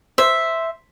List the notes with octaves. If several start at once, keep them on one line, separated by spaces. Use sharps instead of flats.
C5 E5